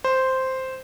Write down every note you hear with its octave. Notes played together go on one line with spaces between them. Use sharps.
C5